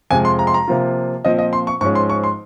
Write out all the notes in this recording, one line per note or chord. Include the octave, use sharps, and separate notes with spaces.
F2 C3 F3 G#3 G#5
C6
A#5
C6
A#5
C3 F3 A#3 F4
A#2 F3 C4 D#5
D#5
C6
C#6
G#2 F3 G#3 C#4 C#6
C6
C#6
C6